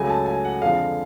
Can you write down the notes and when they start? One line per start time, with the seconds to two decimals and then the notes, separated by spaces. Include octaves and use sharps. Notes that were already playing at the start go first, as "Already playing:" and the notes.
Already playing: C#2 C#3 F#3 A3 G#5
0.10 A5
0.26 G#5
0.45 F#5
0.62 F2 D3 F3 G#3 F5